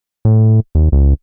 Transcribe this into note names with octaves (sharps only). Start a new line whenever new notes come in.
A2
D#2
C#2